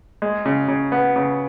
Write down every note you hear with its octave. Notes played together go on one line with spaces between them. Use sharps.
G#3
C#3
C#3
B3
C#3